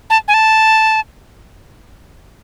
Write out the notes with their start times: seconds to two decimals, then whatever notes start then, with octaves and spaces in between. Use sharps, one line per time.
0.10 A5
0.28 G#5
0.34 A5